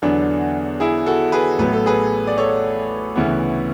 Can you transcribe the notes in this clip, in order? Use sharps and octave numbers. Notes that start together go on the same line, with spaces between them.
E2 D3 F#3 B3 D4
E4 G#4
F#4 A4
G#4 B4
A1 A2 F#3 B3 B4
A4
G#4 B4
D5
A4 C#5
D2 C#3 E3 B3